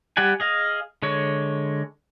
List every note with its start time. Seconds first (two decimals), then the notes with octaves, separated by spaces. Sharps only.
0.17 G3 G4 D5 F#5 G#5
0.40 G#4 D#5 F5
1.02 D3 G#3 C#5